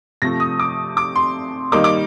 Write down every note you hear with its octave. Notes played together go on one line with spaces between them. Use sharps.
C3 F3 A3 A#6
D#6
D6
D6
C6
D#3 G3 A#3 D#4 D6
D6